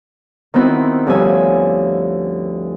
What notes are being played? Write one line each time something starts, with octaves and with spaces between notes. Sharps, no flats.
D#3 B3 C4 E4 F#4
D2 G2 F3 C#4 G#5 E6